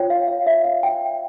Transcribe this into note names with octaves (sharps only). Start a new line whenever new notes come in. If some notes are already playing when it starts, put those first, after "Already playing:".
Already playing: F4 C#5 G5
F5
F5
E5
F5
G5